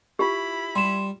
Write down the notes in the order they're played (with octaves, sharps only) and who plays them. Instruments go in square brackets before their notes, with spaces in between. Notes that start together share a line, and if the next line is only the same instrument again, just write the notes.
[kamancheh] E4 B5 [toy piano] F4 G4
[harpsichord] G3 [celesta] C6 E7